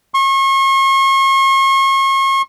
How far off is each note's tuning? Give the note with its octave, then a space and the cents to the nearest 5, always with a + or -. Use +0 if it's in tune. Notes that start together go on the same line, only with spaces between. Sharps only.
C#6 -40